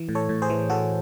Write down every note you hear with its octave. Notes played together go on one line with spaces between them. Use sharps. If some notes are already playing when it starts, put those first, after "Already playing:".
Already playing: E3
A2
A4 C#5
A2
G#4 C5
E3
E3 F#4 A4